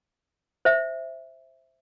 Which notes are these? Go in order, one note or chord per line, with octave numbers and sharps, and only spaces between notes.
C5 E5